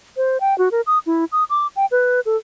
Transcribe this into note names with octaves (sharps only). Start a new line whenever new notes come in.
C5
G5
F#4
A#4
D#6
E4
D#6
D6
G5
B4
A4